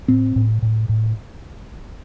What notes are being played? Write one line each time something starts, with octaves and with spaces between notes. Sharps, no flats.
A2 C4
A2
A2
A2